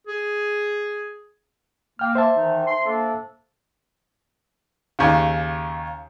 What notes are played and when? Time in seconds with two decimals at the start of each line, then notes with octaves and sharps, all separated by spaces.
0.07 G#4
1.99 A#3 G5 F6
2.15 C5 E5 A5
2.36 D#3 E3 D#4
2.67 C6
2.85 A#3 D4 A4
4.99 D#2 C#3